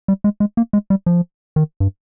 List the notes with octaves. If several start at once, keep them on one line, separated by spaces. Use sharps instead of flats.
G3
G#3
G#3
A#3
G#3
G3
F3
D#3
G2